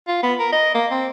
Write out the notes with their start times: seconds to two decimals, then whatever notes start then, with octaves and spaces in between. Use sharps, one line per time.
0.08 F4
0.23 B3
0.39 A#4
0.52 D#5
0.75 A#3
0.91 C4